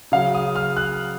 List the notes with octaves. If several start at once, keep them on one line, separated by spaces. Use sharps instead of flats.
C#3 F#3 F5
D#6
F6
F#6